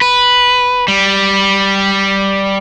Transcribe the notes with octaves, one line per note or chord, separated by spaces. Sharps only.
B4
G3